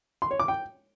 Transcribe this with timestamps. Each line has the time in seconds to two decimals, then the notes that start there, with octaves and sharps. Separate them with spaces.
0.22 C6
0.31 C#5
0.40 D6
0.48 G5